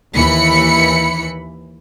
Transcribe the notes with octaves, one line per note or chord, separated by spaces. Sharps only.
D#2 E3 B5 C#7